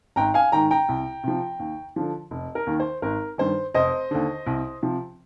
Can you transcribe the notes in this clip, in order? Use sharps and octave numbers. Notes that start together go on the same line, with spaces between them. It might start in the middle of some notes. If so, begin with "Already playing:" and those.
G#1 G5 A#5
F5 G#5
G#2 D#3 G5 A#5
G5 A#5
C2
C3 F3
D#2
D3 F3
F1
A#4
D#2 D#3
C5
G#1 A#4
G2 D#3 C5
F1 C5 D#5
D#2 D3
C2
C3 F3